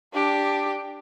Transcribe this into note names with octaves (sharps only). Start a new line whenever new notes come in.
D4 G4